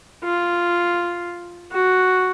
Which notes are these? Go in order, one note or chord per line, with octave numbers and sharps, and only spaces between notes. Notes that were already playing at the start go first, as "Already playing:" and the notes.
F4
F#4